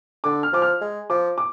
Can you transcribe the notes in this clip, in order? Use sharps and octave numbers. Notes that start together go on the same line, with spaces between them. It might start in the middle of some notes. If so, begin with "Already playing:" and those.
D3 D6
F6
F3 D6
F6
G#3
F3 D6
D6